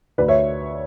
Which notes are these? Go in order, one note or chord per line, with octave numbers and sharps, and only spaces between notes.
D2 B4 D5
C#5 E5